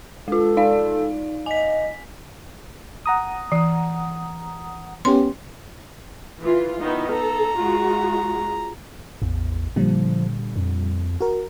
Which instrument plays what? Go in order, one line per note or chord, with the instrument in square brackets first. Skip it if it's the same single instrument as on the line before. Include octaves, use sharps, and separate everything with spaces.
[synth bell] G#3 F4 [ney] A4
[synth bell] D#4 D5 F5
[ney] D#5 [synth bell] G#5 B6
[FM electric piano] F#5 A#5 D#6
[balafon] E3
[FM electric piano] B3 C#4 G4 [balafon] C6
[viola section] E3 F4
[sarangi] D#3 [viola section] B3 D#4 E4
[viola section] A4 [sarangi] A#5
[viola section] G#3 F4 F#4
[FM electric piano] A1 [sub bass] E2
[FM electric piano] A#2 D3 G3 [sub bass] F3
[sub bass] F2
[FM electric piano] F#4 A#4